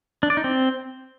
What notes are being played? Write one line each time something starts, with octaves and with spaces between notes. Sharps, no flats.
D4
D5
D#4
C4